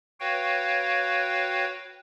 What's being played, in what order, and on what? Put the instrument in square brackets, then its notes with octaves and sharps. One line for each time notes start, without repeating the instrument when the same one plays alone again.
[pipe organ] F#4 B4 C#5 F5 G5